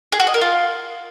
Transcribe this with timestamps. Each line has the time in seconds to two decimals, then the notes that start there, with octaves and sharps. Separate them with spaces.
0.12 G#4
0.20 F#4
0.27 D#5
0.34 A#4
0.41 F4